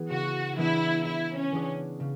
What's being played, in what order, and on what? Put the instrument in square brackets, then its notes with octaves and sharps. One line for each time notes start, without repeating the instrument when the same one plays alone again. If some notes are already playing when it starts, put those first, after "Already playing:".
Already playing: [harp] E3 B3 G#4
[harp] C#3 [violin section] F#4
[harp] E3 B3 D4 G#4 [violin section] E4
[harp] C#3 [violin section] E4
[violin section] C#4
[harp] E3 B3 D4 G#4
C#3